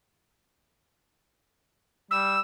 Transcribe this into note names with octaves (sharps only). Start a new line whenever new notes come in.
G3 E6